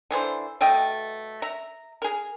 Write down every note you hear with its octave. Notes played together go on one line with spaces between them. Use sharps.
D3 E3 G#4 C5
B2 A3 D#5 G5
E5 A#5
G#4 A#4